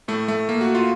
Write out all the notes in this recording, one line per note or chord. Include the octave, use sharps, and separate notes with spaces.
A2 A3
A3
A#3
F#4
F4